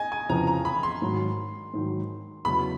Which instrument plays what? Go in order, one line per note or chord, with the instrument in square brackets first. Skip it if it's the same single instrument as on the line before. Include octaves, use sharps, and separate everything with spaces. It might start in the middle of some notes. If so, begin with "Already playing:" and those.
Already playing: [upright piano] D#5 G#5
G#5
[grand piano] F2 C#3 E3 [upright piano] A#5
[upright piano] A#5
B5
C6
[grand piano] G#2 D#3 F#3
G#2 D#3 F#3
[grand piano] E2 C#3 F#3 B3 [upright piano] B5